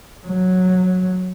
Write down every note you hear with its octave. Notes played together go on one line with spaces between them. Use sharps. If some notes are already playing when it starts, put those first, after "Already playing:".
F#3